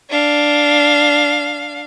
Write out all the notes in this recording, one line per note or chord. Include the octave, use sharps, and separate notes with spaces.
D4 F5